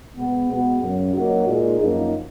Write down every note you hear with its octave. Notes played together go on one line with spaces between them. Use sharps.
B2 G#3 B3
B2 G#3 B3 F#4
F#2 C#3 F#3 C#4
F#3 A#3 D#4 F#4
A#2 G#3 D#4 G#4
F#2 F3 A#3 D#4